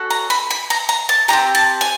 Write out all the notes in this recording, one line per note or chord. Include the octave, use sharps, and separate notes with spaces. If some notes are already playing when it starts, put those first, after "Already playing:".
Already playing: C#4 F#4 A4
A#5
B5
B5
A#5
A#5
A5
C4 D#4 G4 A#5
A5
G#5